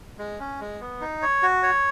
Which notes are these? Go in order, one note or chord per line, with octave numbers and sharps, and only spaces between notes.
G#3
C#4
G#3
B3
D#4
C#5
F#4
C#5